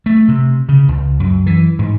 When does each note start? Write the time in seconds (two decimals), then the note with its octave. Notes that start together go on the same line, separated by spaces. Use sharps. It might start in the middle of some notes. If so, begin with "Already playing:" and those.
0.06 A3
0.28 C3
0.69 C#3
0.88 C#2
1.20 F#2
1.46 E3
1.79 G#2